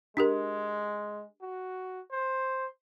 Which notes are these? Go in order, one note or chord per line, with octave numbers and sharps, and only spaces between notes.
G#3 D4 G4 A#4
F#4
C5